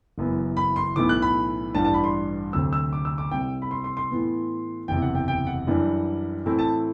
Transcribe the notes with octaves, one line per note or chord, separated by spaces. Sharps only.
F#1 F#2 E3 B3
B5
C6
B1 A2 E3 B3 E4 D6
F#6
B5
A1 G2 E3 G3 D4 A5
A5
B5
C6
D2 C3 F#3 C4 E6
E6
D6
E6
D6
C2 C3 G3 C4 G5
B5
C6
C6
C6
A2 E3 B3
F#1 E2 C3 G5
F#5
G5
G5
F#5
F#2 E3 G3 D4
A2 E3 A3 C4 E4
A5